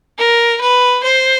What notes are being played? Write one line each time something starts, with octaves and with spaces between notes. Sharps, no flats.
A#4
B4
C5